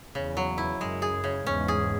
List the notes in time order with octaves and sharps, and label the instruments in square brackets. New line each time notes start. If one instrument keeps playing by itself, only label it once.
[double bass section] E2 [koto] C#3
[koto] F#3
E4
[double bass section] F#2 [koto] G#3
[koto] G#4
C#3
[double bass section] E2 G#2 [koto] C#4
[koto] G#4